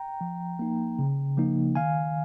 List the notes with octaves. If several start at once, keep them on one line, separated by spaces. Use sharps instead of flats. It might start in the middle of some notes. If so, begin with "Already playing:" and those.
Already playing: G5 A#5
F3
A#3 D#4
C#3
F3 A#3 D#4
D#3 F5 G#5